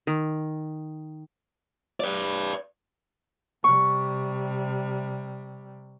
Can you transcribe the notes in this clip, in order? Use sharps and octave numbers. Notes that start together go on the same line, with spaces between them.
D#3
B4 D5
C3 G3 C#6